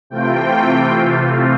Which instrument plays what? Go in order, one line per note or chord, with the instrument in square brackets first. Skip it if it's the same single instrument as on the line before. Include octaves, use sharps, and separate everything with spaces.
[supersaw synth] C3 E3 A3 C4 F4 G5